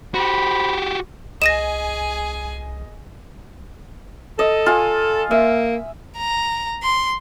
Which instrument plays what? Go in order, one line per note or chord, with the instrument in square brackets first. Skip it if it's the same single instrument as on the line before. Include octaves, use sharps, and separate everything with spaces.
[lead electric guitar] F#4 G4 [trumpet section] C5 B5
[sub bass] C2 [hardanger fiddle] G#4 G#5 [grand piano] D#5 [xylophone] A#6 D#7 E7
[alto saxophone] A4 [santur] D#5
[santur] F4 G#5
[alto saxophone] A#3 [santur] E5
[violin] A#5
C6